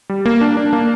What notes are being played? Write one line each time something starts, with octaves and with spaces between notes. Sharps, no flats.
G3
A#3
D4
D4
A#3